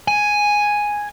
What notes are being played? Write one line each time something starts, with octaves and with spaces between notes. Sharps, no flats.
G#5